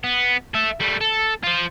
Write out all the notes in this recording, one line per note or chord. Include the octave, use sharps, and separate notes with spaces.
B3
A4 E5
G3 A3
A4
F4 C5